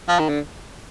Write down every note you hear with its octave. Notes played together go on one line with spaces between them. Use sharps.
F3
D#3
D3